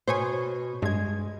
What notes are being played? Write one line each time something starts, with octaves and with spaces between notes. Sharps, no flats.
B2 C5 C#5 G#5
G2 G#3 G#6